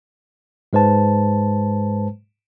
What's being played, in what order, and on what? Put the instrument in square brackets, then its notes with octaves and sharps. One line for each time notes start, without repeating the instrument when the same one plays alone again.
[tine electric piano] G#2 G#3 B4 C5 A5